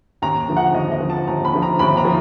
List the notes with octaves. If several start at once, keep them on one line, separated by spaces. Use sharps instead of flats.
D#2 A#5
D3 F3
F#5
D#2 D#5
D#5
D3 F3
A5
D#2 A#5
B5
D3 F3
A#5
D#2 B5
A#5
F3